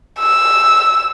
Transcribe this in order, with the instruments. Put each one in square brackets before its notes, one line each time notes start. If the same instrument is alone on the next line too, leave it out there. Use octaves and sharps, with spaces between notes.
[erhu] E6